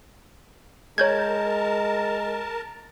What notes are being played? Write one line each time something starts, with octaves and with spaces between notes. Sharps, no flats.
G#3 A#4 C#5 A5 G6 G#6